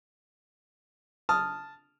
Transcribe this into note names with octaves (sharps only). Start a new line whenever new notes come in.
A5 D#6 F6